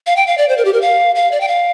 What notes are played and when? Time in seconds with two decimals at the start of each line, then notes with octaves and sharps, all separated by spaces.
0.07 F5
0.16 G5
0.27 F5
0.38 D5
0.49 C5
0.58 A#4
0.65 G4
0.73 A#4
0.81 F5
1.15 F5
1.32 D5
1.41 G5
1.48 F5